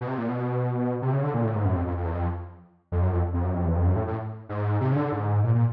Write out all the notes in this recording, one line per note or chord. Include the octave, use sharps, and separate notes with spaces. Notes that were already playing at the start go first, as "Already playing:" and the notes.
B2
C3
A#2
B2
C3
C#3
D3
A#2
A2
G#2
F#2
F2
F2
F2
E2
F2
F2
F#2
F2
F2
F#2
F2
E2
F2
F#2
A2
A2
G#2
C3
C#3
D3
G#2
A#2
A#2